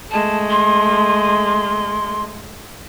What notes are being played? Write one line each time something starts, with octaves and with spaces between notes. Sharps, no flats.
G#3 A3 A5
C6